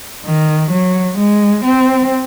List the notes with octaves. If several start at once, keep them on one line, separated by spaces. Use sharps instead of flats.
D#3
F#3
G#3
C4